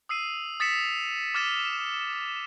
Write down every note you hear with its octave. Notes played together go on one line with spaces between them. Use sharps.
D#6 E6 C7 D#7
D#6 A6 B6 C#7 E7
D6 F6 A6 E7